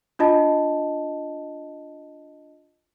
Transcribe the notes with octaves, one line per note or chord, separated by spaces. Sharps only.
D4 F4 D#5 A5